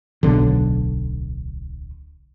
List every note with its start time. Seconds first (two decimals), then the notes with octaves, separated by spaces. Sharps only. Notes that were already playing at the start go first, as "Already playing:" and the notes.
0.23 D1 B1 D3